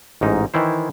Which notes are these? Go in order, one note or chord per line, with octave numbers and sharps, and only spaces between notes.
A1 G#2 D#4
D#3 E3 E4 C5